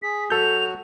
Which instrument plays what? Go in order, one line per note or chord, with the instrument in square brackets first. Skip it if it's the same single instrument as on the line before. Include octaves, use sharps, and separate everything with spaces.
[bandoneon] G#4 [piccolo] B6
[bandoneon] F#3 F#4 [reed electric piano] A4 G6 [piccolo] F7